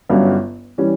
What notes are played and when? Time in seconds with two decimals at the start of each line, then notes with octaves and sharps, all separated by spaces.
0.09 G1 G2 F#3 C#4
0.78 E3 G3 C#4